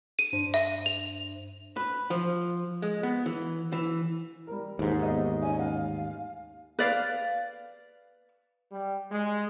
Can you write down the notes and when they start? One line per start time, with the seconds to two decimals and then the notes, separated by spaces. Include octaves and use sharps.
0.19 D#7
0.33 G2 D4 C5
0.54 E5
0.86 F7
1.77 B4
2.10 F3
2.82 G#3
3.03 B3
3.26 E3
3.72 E3
4.47 G3 A#4
4.79 D#2 G#2 D#4
5.03 E2 B3 D#5
5.43 C#4 D#5 G#5
5.59 A1 F5 F#5
6.79 B4 D5 F5
8.72 G3
9.10 G#3